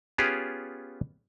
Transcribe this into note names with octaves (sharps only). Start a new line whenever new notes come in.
B3 C#4 F4 G4 G#4